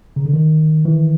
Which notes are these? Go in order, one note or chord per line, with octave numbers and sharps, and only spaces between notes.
C#3
D3
D#3
E3